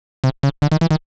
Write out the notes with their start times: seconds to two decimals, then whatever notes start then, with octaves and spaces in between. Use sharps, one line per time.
0.24 C3
0.43 C#3
0.62 D3
0.72 D#3
0.81 E3
0.91 D#3